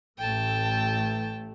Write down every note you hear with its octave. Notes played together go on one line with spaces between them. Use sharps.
A1 A3 G5 A5